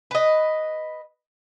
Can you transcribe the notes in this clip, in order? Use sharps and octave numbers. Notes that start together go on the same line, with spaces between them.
B4 D#5